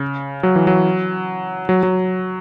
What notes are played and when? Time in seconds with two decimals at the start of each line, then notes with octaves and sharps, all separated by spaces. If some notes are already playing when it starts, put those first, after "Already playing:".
Already playing: C#3
0.43 F#3
0.56 E3
0.67 F#3
1.69 F#3
1.83 F#3